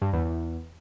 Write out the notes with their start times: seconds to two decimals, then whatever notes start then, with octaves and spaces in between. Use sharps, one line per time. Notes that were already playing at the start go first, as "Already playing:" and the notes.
0.02 G2
0.13 E2
0.25 E2